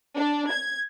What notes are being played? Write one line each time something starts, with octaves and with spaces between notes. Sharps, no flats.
D4
G#6